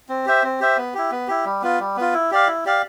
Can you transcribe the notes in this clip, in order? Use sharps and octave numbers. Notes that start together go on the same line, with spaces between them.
C4
G4 C5 E5
C4
G4 C5 E5
B3
E4 G4
B3
E4 G4
G3
B3 F4
G3
B3 F4
E4
G4 D5 F5
E4
G4 D5 F5